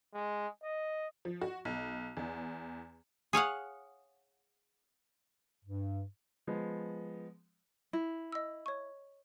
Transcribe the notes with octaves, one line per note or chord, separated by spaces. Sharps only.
G#3
D#5
F3
F#4
B1
E2
G#4 C#5 F5 F#5
G2
F3 G#3 B3
E4
D#5 E6
C#5 C#6